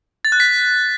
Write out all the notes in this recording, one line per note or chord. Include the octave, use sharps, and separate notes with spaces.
A6
F#6
B6